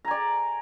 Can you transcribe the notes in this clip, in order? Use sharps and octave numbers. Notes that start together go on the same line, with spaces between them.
D5 G#5 A#5